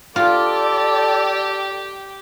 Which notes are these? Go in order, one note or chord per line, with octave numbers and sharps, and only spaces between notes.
F4 G4 A4 D5 G5